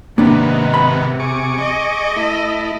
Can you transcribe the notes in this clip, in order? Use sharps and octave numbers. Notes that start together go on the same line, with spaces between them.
G#2 C3 D#3 A#3 B3 D4
B5
G#4 C#6 D6
D#5
A3 E4